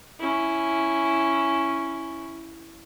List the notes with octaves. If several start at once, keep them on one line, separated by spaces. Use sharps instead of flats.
C#4 E4